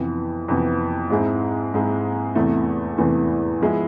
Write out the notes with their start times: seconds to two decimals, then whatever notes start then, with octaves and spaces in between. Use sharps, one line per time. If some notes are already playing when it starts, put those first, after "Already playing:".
Already playing: F2 C3 E3 B3
0.48 F2 C3 E3 B3
1.10 G#2 G#3 C4 E4
1.74 G#2 G#3 C4 E4
2.35 E2 C3 E3 A3
2.98 E2 C3 E3 A3
3.61 F3 G#3 B3 E4